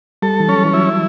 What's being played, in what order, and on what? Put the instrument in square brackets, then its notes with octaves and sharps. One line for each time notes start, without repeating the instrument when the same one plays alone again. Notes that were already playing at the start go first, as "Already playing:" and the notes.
[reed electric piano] G3 [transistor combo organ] A4
[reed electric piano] E3
[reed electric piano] F#3 [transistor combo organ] C#4
[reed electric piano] E3
[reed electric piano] F#3 [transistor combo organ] E4